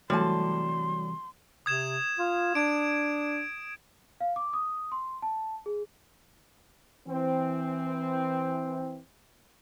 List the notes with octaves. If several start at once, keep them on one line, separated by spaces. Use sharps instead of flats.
C2 E3 F#3 G3 A3 A5 C6
C3 D#6 G#6 E7
F4
D4 G#6 D7
F5
D6
D#6
C6
A5
G#4
E3 C4